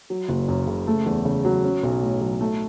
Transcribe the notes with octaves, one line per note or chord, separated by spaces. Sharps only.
F#3
F#1
F#2
C#3
A3
E2
C#3
F#3
C#4
B1
A2
F#3
A3